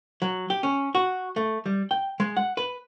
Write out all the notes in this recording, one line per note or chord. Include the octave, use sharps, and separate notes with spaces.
F#3
G4
C#4
F#4
A3
G3
G5
G#3
F#5
B4